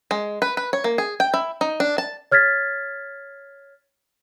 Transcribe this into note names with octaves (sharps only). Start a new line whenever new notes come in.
G#3
B4
B4
C#5
A#3
G#4
G5
E4
D#4
D4
A5
C#5 F6 G#6 A6 B6